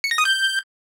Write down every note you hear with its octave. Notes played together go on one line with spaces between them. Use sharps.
C#7
A#6
D#6
G6